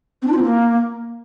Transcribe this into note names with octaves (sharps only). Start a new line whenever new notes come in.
C4
D4
F4
C4
A#3